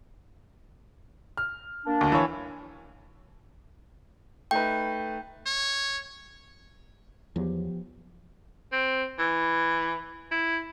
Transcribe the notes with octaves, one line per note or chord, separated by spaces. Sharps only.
F6
A#3 D4
D2
E3 C#5
A3 D#4 B4 G5
C#5
E2 F3 F#3 B3 G4
C4
E3
E4